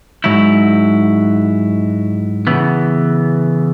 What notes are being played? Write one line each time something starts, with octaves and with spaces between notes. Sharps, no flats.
G#2 F#3 E4
C#3 E3 B3